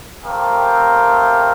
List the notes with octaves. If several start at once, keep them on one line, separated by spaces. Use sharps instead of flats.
A3 C4 G4 A#4 F5